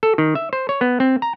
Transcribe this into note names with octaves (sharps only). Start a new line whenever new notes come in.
A4
D#3
E5
C5
C#5
B3
C4
A#5